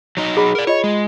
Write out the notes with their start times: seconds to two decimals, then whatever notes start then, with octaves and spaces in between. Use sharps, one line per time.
0.17 F#3 D#4 D#5
0.37 G#4 F#5 B5
0.55 A#4 D5
0.67 F4 C#5 D#5
0.84 G#3